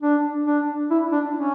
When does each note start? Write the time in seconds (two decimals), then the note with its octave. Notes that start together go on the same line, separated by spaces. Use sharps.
0.02 D4
0.46 D4
0.91 E4
1.12 D4
1.35 C#4